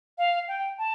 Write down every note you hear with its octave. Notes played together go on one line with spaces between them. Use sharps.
F5
G5
A5